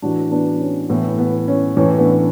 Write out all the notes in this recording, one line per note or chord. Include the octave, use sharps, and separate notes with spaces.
A2 E3 D4 F#4
B3 D4
C#4
A2 E3 B3
B3
C#4
A2 E3 C#4
B3 D4